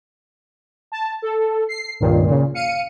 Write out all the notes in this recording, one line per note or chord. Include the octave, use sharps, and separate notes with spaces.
A5
A4
C7
C#2 G2 A#2 D#3
A#2 C#3
F5 C#7 D#7